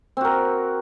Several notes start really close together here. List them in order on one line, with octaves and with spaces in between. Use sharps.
C4 F#4 A#4